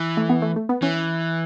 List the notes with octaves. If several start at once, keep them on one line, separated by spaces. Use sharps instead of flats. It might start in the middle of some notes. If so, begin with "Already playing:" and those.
Already playing: E3
A3
B3
A3
A3
B3
E3 C#4